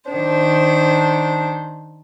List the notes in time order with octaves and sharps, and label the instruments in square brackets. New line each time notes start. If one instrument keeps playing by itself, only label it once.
[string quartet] D#3 D4 C5